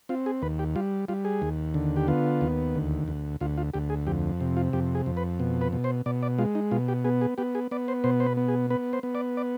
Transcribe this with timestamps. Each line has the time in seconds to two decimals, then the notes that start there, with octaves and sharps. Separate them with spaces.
0.09 C4 F4
0.26 G#4
0.42 D#2 B4
0.59 G4
0.76 G3 F4
1.08 G3 F4
1.25 G#4
1.42 D#2
1.74 D3
1.96 G4
2.08 B3 F4
2.41 D#2
2.75 D2
3.08 D2
3.41 D2 F4
3.57 F4
3.73 D2 G4
3.90 G#4
4.07 F2 G4
4.40 C3
4.57 F4
4.73 F2 G4
4.95 G#4
5.06 F2
5.17 B4
5.40 B2
5.61 B4
5.73 B2
5.84 C5
6.06 B2 D5
6.23 D5
6.39 G#3 F4
6.55 D#4
6.71 B2 F4
6.88 G4
7.04 B3 G#4
7.21 G#4
7.38 B3 G4
7.55 G#4
7.71 B3 D5
7.88 C5
8.04 B2 C5
8.20 C5
8.26 B4
8.37 B3
8.48 G#4
8.70 B3 B4
8.93 C5
9.03 B3
9.15 D5
9.37 D5